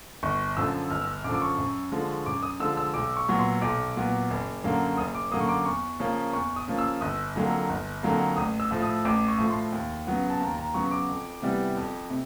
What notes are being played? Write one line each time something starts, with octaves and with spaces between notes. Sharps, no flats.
G1 C#6
F#2 D3 F3 E6
G1 F6
E6
F6
F#2 D3 F3 D6
D6
C#6
F#2
D3 F3 G#3
F#2 D6
D#6
D3 F3 G#3 E6
E6
B1 D6
C#6
A#2 F#3 B3
C6
B1 D6
A#2 F#3 B3
F#1
F#2 D3 F#3 A#3
F#1 D#6
D6
F#2 D3 F#3 A#3 D#6
C#6
D6
E2 C#6
C#3 F3 A#3 C#4
E2 C#6
D#6
C#3 F3 A#3 C#4
E6
G1 D#6
F2 D3 F#3 A#3
G1
F2 D3 F#3 A#3
A1 D#6
E6
A2 F3
D#6
A1 D6
C#6
A2 F3
C6
D#2
C#3 F#3 B3
A5
D#2 A#5
A#5
C#3 F#3 B3 C#6
D6
F2
C3 E3 G3 B3
F2
C3